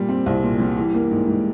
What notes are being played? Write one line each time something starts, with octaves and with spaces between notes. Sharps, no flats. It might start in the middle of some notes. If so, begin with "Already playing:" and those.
Already playing: A#2 G3
C4
C2
A#2
G3
E3
A#3
G#2
G#2